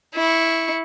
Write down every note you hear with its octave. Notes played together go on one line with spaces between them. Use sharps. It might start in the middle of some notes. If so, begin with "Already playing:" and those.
E4 C#6